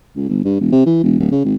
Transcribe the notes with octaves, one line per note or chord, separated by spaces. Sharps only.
C#2
G1
G2
E1
C3
E3
E1
D1
C#3
G#1